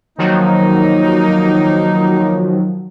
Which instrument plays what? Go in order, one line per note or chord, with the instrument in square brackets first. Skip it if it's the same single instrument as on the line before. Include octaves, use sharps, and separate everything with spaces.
[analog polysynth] D#3 F3 F#3 [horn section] A#3 D#4